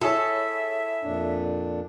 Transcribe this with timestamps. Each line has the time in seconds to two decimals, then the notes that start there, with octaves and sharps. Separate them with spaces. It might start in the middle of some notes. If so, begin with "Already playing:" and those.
0.01 E4 G#4 A4 C#5 E5
1.03 F2 A#2 D4